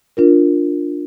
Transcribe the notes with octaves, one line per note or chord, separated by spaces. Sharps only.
D4 F4 A#4